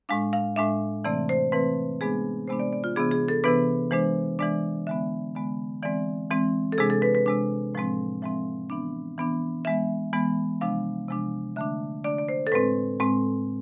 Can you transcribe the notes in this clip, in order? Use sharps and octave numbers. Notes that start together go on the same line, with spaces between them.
A2 G#3 D4 F5
F5
A2 G#3 D4 E5
C3 E3 A3 C4 D5
C5
C3 E3 A3 C4 B4
C3 G#3 B3 D4 G#4
C3 G#3 B3 D4 C5
D5
D5
F4
C3 E3 B3 D4 G#4
G#4
A4
C3 E3 B3 D4 B4
E3 G#3 D4 C5
E3 G#3 D4 D5
D3 G#3 B3 E5
D3 G#3 B3
E3 G#3 C4 D5
E3 G#3 C4
A4
C3 G#3 D4 G#4
A4
B4
B4
C3 G#3 D4
A2 F3 G#3 C4
A2 F3 G#3 C4 E5
E3 B3 D4
E3 B3 D4
E3 G#3 B3 E5
E3 G#3 B3
C3 F3 G#3 D4 F5
C3 F3 G#3 D4
D3 A3 D4 E5
D3 A3 D4 D5
D5
C5
A4
A2 G#3 C4 B4
A2 G#3 C4